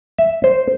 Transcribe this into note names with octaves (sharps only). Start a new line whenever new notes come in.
E5
C5